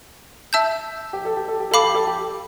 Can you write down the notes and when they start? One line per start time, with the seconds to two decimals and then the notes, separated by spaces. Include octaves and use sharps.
0.53 E5 A5 E6 G6
1.13 G4
1.25 A4
1.37 G4
1.48 A4
1.60 G4
1.71 A4 F5 B5 D6
1.83 G4
1.95 A4
2.07 G4